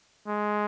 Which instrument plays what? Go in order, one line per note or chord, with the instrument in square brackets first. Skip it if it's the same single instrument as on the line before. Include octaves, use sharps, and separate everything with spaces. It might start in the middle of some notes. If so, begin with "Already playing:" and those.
[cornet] G#3